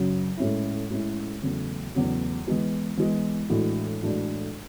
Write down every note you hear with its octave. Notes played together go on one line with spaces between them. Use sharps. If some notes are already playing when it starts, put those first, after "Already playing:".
Already playing: F#2 C#3 F#3
A2 G#3 C#4 E4
A2 G#3 C#4 E4
E2 C#3 F#3 A3
E2 C#3 F#3 A3
E3 G#3 B3
E3 G#3 B3
A2 E3 G#3 D4 F#4
A2 E3 G#3 D4 F#4